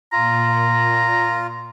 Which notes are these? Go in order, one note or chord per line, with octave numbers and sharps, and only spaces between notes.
A#2 F4 A#5